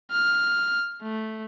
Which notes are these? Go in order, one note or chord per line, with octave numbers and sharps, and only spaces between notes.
F6
A3